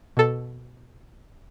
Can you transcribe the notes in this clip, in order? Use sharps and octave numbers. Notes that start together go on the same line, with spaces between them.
B2 A4